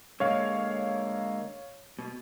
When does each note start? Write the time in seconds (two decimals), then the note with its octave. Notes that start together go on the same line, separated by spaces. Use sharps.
0.20 D3 G#3 A#3 C#5 F5
1.99 B2